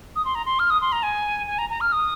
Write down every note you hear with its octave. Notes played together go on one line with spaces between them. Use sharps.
D#6
C6
A#5
C6
F6
D#6
C6
A#5
G#5
G#5
A#5
A#5
F6
D#6